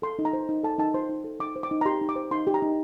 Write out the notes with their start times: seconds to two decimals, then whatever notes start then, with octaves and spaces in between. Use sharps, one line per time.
0.02 A4 C6
0.19 D#4
0.25 A#5
0.33 C5
0.49 D#4
0.63 A4 A5
0.78 D#4 A5
0.94 C5 C6
1.09 D#4
1.24 A4
1.40 D#4 D6
1.56 C5
1.63 D6
1.71 D#4
1.81 A#5
1.86 G4 C6
2.01 D#4
2.09 D6
2.16 C5
2.31 D#4 C6
2.47 G4
2.54 A#5
2.62 D#4